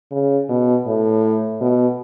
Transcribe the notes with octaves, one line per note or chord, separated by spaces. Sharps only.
C#3
B2
A2
B2